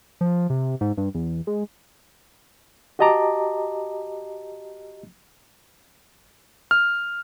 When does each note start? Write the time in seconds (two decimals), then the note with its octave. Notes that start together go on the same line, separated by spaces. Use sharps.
0.21 F3
0.50 C3
0.81 G#2
0.97 G2
1.15 E2
1.47 G#3
2.99 F#4 G4 D#5 A5 A#5 D6
6.71 F6